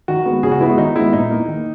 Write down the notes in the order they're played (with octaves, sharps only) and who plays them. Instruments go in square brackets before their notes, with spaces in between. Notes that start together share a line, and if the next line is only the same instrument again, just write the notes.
[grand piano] D#3 F#4
G#3 B3
C#3 G#4
F#4
B3 E4
G#3 F#4
D#3 D#4
G#3 B3 E4
A#2 D#4
A#3
D#3